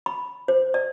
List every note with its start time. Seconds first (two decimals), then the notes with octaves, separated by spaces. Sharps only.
0.06 B5
0.48 C5
0.74 D5